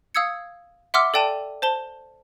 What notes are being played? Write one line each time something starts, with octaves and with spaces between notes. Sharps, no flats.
F5 D#6 E6 G#6 C#7
E5 F#5 C6 D6 E6 F6
A4 D5 G5 A5 D#7
C5 A5 G7